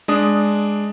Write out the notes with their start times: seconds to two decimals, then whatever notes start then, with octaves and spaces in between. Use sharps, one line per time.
0.08 G#3 D4 D#6